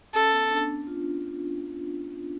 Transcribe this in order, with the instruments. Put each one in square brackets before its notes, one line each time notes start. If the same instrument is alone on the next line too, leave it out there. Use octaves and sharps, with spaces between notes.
[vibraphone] C#4 [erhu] A4
[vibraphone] B3
D4
D4
F4